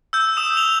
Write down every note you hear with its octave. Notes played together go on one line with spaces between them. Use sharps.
E6 G6
D#6 E7
F7 G7